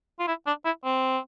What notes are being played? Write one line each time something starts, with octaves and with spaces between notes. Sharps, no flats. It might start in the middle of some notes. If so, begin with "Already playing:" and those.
F4
E4
D4
E4
C4